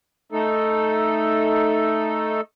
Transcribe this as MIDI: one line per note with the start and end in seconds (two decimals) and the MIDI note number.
0.32 2.41 57
0.32 2.41 63
0.32 2.41 69